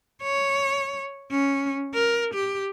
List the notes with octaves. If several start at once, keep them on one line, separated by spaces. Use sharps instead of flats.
C#5
C#4
A#4
G4